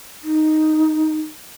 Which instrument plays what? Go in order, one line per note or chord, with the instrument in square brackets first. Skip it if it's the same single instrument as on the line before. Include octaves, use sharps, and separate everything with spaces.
[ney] D#4